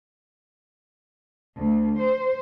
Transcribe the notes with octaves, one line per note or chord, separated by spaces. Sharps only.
D2
C5